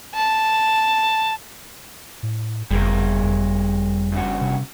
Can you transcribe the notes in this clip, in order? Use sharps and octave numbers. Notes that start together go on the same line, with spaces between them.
A5
A2
F#1 F2 G3 G#4 A#4
F2
G2 C#3 F#4
C3